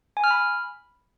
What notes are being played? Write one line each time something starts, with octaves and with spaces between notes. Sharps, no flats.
G#5
F6
B5